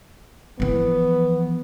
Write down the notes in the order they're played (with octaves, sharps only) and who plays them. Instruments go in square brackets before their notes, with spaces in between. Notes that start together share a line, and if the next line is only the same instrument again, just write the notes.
[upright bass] E3 F3 [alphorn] B3